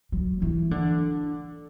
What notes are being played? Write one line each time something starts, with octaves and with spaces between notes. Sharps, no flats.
F#3
E3
D3